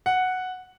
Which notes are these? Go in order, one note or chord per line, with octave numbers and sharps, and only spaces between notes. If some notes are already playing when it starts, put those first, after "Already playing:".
F#5